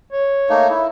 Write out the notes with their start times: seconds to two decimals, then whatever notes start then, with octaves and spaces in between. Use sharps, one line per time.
0.13 C#5
0.50 A3 A#3 D#4
0.70 E4